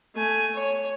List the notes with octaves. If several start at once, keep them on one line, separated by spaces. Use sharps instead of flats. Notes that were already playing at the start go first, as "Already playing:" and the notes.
A3 G#5
C#5